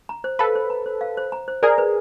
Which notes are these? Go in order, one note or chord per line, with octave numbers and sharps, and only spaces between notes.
A#5
C5
A4 B4 F5
C5
A#5
C5
F5
C5
A#5
C5
G#4 A#4 D5
B4